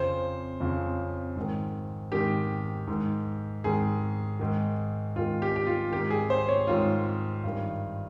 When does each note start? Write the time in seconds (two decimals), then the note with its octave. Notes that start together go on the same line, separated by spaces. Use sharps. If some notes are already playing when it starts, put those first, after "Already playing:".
Already playing: F2 C#3 C5
0.60 F2 C#3
1.36 G#2
1.41 D#3
2.12 G#2 D#3 G4
2.88 G#2 D#3
3.64 G#2 D#3 G#4
4.40 G#2 D#3
5.16 G#2 D#3 F4
5.42 G4
5.56 G4
5.67 F4
5.92 G#2 D#3 G4
6.10 G#4
6.30 C5
6.49 C#5
6.67 G#2 D#3 F4
7.44 G2 D#3